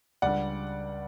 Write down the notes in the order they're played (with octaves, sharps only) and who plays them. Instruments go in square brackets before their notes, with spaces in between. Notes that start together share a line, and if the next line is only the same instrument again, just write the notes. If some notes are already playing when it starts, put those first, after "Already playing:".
[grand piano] C#2 C#3 G3 D4 D5 F#5